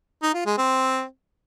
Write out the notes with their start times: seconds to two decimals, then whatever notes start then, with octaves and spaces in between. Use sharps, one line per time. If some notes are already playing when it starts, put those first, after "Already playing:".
0.22 D#4
0.34 F4
0.46 G#3
0.58 C4